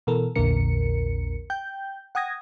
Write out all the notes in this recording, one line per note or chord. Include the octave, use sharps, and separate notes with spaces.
B2 E3 A4 A#4
A#1 E2 A#2 D3 A#4 C#7
G5 G6
F#5 G5 D#6 G#6 A#6